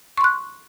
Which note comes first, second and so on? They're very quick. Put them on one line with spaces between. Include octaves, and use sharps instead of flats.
C#6 C6 F#6